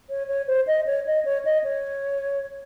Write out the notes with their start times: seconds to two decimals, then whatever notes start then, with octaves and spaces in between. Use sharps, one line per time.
0.10 C#5
0.28 C#5
0.47 C5
0.67 D#5
0.86 C#5
1.07 D#5
1.25 C#5
1.45 D#5
1.64 C#5